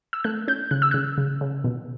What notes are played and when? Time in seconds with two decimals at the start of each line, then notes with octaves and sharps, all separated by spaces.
0.13 E6
0.24 A3 F#6
0.48 C#4 G6
0.71 C#3 F#6
0.82 E6
0.91 C#3 F#6
1.18 C#3
1.41 C#3
1.64 B2